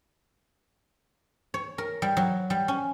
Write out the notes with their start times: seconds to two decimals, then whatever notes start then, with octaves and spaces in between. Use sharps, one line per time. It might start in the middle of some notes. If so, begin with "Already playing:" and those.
1.54 C#5
1.78 A#4
2.02 G3
2.17 F#3
2.50 G3
2.68 C#4